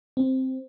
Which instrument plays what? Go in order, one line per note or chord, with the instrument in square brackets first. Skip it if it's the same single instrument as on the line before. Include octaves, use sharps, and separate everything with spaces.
[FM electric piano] C4